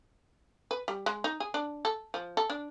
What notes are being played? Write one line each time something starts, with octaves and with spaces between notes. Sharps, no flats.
B4
G3
G#3
D#4
G#4
D4
A4
F3
A4
D4